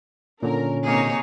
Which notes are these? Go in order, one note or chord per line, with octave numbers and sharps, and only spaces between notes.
A#2 D3 C#4 A#4
C3 A#3 D#4 G#4 C#5